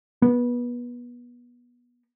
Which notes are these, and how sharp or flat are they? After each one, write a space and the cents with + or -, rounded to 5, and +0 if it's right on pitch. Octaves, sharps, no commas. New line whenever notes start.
B3 -25